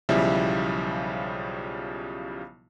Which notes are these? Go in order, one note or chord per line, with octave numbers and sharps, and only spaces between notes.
B1 C#3 F3 G3 E4 E5